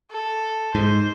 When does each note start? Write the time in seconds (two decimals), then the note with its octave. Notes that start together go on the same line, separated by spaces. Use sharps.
0.12 A4
0.75 G#2 C5